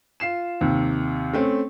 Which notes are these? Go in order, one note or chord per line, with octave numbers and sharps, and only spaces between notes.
F4 C7 E7
D#2 C3
A3 C4 C#4